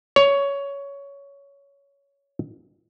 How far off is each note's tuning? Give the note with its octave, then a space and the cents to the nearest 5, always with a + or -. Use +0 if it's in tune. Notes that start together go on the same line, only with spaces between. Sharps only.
C#5 +15